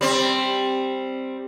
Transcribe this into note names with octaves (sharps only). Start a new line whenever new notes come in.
G3 C4